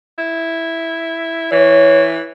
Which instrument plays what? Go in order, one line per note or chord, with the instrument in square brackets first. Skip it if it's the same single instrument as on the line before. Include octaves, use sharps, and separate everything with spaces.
[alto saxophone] E4
[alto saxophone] E3 [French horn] C#5